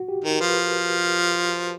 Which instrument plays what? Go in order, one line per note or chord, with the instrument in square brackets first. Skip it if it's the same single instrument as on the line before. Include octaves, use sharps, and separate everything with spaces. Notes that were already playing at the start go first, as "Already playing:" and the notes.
Already playing: [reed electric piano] F#4
G4
[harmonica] D#3 [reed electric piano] A#4
[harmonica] F3 [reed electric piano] B4